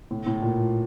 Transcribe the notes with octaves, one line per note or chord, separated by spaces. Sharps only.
A2
A2
A#2